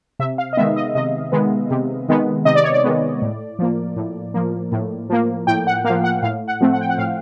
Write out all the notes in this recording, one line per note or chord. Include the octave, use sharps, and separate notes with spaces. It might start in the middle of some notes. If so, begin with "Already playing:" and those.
C3 E5
F5
D#5
D#3 G#3 B3 E5
D#5
C3 D#5
D#3 G#3 B3
C3
D#3 G#3 B3
C3 D#5
D5
C#5
D5
D#3 G#3 B3
A2
F3 A#3
A2
F3 A#3
A2
F3 A#3
A2 G5
F#5
A#3 F5
F3
F#5
A2 F5
F#5
F3 A3 C4
F#5
G5
F#5
A2 F5